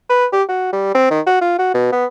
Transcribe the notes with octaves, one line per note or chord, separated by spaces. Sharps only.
B4
G4
F#4
G3
C4
D#3
F#4
F4
F#4
B2
B3